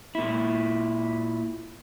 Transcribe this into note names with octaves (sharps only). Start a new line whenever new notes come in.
A#2 E4